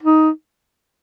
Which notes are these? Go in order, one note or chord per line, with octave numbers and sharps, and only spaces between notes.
D#4